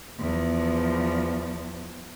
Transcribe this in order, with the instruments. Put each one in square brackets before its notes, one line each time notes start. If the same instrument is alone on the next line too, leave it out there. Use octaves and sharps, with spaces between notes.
[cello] E2 F3